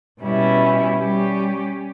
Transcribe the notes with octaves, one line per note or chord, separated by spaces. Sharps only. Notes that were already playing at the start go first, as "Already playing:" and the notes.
B2 G3 C#4 E4
G3 C#4 G4